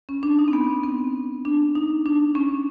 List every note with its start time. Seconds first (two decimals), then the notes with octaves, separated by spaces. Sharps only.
0.09 C#4
0.23 D4
0.39 D#4
0.48 C4
0.53 B3
0.84 C4
1.45 D4
1.75 D#4
2.06 D4
2.35 C#4